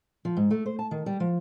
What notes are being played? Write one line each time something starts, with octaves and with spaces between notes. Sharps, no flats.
F3
G#2
A3
C5
A5
D#3
G3
F3